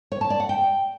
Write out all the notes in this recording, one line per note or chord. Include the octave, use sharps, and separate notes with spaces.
C#5
A5
D5
F#5
G5